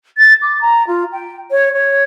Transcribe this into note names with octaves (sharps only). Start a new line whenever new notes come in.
A6
D6
A#5
F4
G5
C#5
C#5